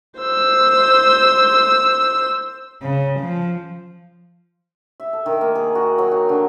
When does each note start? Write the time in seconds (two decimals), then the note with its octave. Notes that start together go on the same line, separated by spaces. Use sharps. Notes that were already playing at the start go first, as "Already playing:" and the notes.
0.20 C5 E6
2.82 C#3
3.20 F3
5.00 E5
5.13 A4
5.26 D#3
5.41 A#3
5.55 G#4
5.75 F#4
5.98 F#3
6.12 D#4
6.29 D3